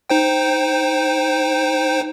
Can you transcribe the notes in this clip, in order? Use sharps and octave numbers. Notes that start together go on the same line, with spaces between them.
D#4 C5 G5